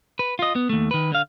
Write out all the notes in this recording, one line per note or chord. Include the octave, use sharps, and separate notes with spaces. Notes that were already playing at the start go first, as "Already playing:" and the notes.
B4
F4 D#5
B3
D#2 A3
D#3 B4
D3 F5